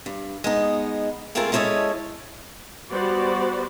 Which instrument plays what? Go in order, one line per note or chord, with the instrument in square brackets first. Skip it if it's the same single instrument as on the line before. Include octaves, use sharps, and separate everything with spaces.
[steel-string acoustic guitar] G2
G#3 B3 D#4
G#3 A3 C4 F4 G#4 A#4
G#3 C#4 E4 A4 C#5 D#5
[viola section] G3 B3 F#4 C5 D5